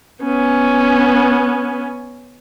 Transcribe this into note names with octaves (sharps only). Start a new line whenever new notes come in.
B3 C#4